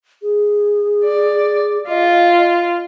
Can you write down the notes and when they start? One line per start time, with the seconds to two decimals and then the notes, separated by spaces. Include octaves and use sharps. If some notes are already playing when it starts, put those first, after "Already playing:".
0.22 G#4
1.05 D5
1.89 F4 D#5